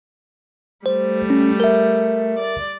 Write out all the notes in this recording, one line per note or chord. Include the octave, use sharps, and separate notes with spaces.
G3 A3 C5
C#4
A#4 E5
D5